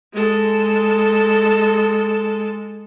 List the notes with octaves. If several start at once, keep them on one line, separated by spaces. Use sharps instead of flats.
G#3 A4